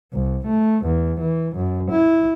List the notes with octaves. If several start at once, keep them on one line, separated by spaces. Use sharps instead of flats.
C2
A3
E2
E3
F#2
E4